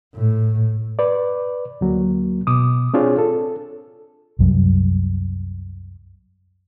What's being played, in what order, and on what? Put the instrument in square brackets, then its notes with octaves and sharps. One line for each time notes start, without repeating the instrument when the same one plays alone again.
[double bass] A2
[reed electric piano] B4 D5
D2 F#3 A#3
B2 D6 D#6
C4 D4 F4 G#4 C#5
A4
[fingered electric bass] C2 F#2 G3